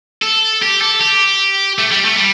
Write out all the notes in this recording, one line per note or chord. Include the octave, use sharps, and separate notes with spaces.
A4
G4
A4
G4
A3
G3
A3
G3